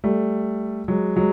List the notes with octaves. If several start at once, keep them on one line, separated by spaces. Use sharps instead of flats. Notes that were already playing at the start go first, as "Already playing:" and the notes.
G3 A3
F#3 G#3
F#3 G#3